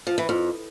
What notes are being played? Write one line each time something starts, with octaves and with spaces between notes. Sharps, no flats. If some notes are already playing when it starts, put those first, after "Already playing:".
F3
E3
F2